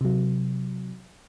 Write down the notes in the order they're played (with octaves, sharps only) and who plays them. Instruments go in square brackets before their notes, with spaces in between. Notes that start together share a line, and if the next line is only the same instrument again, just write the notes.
[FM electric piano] C3 F#3